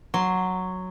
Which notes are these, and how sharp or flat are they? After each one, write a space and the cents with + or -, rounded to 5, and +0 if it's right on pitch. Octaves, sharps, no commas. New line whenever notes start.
F#3 +0 C6 +0